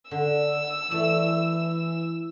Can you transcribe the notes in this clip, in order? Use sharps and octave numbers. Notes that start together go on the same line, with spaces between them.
D3 E6
E3 A3 D5